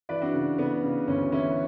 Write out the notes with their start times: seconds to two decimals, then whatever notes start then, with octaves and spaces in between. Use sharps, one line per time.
0.09 E3 B4 D5
0.22 D4 F#4
0.33 C#3
0.58 C#3 B3
0.83 C#3
1.08 D2 C#4
1.32 E3 C#4 E4